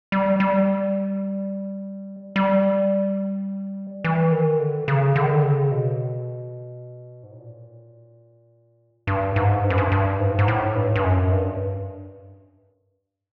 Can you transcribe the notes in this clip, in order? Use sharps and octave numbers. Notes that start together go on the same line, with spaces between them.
G3
G3
G3
E3
D#3
D3
C#3
D3
D#3
D3
C#3
B2
G#2
A2
A#2
G2
G#2
G2
F#2
G2
G2
G#2
G#2
A2
G2
G2
F#2
G2